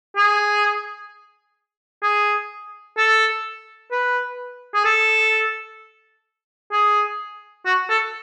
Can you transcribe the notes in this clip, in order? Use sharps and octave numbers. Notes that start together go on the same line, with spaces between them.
G#4
G#4
A4
B4
G#4
A4
G#4
F#4
A4